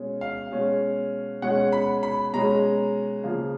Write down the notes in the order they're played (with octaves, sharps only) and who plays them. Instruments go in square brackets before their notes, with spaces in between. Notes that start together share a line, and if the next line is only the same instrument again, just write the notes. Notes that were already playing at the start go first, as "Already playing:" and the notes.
Already playing: [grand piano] B2 G#3 C#4
F5
B2 G#3 C#4
B2 G#3 C#4 F#5
B5
B5
B2 G#3 C#4 A#5
C#3 F3 A#3